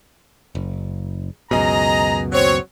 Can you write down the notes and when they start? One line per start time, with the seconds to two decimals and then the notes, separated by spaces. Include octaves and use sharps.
0.55 F#1
1.51 C#2 F#2 B2 G#4 D#5 A#5
2.32 F#3 C4 C#5